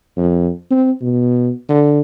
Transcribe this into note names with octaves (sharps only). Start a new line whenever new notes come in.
F2
C4
B2
D3